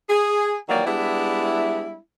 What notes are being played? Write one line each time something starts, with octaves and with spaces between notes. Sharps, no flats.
G#4
D#3 E3 F#3 G3 A#3 D5
G3 G#3 B3 D4 E4